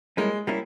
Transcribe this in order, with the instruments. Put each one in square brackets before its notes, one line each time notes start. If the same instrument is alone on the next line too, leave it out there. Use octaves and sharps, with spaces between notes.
[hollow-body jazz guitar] G3 A#3 C#4 E4 [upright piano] G#3
[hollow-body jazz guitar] G3 A#3 C#4 E4